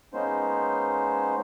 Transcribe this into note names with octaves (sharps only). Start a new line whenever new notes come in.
G#3 A#3 B3 C#4 D#4 C5